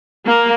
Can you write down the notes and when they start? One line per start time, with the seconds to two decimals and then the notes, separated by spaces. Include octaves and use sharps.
0.25 A#3